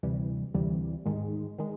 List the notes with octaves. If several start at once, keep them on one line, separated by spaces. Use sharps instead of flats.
D2 C3 E3 G3
D2 C3 E3 G3
G#2 D#3 G#3
D#3 G#3